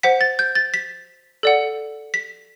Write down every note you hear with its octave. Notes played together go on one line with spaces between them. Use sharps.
C5 F#5 B6
A6
G6
A6
B6
A4 D5 F#5
B6